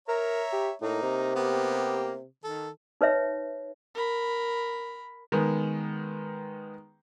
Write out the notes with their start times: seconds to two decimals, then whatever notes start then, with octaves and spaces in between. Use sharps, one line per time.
0.08 A#4 C#5 E5 A#5
0.53 G4
0.82 A2 A#3 D#4
1.02 C3
1.36 A#3 B3 G4
2.44 D#3 A4
3.01 D#4 B4 C#5 E5
3.95 A#4 B5
5.32 D#3 G#3 B3